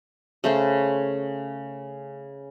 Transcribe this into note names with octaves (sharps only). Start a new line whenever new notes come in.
C#3 A3 C5